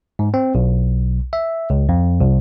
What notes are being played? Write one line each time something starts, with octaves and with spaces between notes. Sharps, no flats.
G#2
C4
B1
E5
C#2
F2
C2